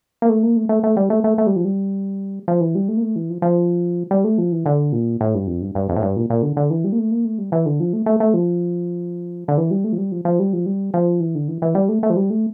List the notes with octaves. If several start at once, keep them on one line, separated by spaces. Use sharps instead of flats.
A#3
A3
A#3
A3
A3
A3
G3
A3
A3
A3
G3
F3
G3
F3
E3
G3
A3
A#3
A3
E3
F3
F3
G3
A3
F3
E3
D3
A#2
A2
G2
F2
G2
G2
F2
A2
G2
A#2
A#2
D3
D3
E3
G3
A#3
A3
A#3
A3
G3
E3
D3
F3
A3
A3
A3
F3
D3
E3
G3
A3
F3
G3
F3
F3
G3
F3
G3
F3
E3
D3
E3
E3
G3
A3
A3
F3
G3
A3